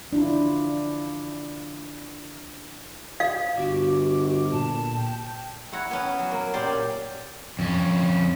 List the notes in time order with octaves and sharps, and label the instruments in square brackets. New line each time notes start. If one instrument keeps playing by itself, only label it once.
[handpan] D4 E4 F4
[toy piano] F5
[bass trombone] G1 [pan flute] F#4 [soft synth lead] D6
[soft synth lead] A#2 [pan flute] A5
[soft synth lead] G5
[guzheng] E4 C#5 F#5 A#5
B3 C#4
F#3
A#3
A#2 C#4 G4 D5 C6
[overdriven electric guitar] F2 C#4